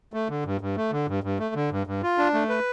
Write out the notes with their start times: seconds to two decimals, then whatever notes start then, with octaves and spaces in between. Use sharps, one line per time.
0.14 A3
0.29 D3
0.45 G2
0.61 G2
0.77 A3
0.92 D3
1.08 G2
1.24 G2
1.40 A3
1.55 D3
1.71 G2
1.87 G2
2.03 F4
2.18 D4
2.34 A3
2.49 B4